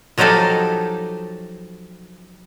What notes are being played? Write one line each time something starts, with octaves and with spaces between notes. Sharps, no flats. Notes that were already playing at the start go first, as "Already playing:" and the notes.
F3 F#3 D#4 G4 A4 F5